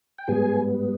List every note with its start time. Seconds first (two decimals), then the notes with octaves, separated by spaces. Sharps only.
0.18 G5
0.28 G#2 G3 B3 G#4 G#5